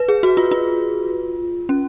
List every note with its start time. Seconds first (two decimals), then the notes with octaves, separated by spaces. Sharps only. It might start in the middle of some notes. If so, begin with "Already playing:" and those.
Already playing: B4
0.08 G#4
0.23 F#4
0.37 F4
0.51 F4
1.69 C#4